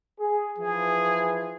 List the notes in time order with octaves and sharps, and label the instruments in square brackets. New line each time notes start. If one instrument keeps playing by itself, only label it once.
[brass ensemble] G#4
[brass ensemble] E3 F3 [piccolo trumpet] G#4